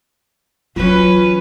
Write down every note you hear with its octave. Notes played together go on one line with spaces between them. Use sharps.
E3 F#3 C#4 F4 B4